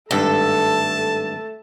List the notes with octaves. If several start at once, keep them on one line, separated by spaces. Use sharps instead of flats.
G#1 G2 A3 A4 A5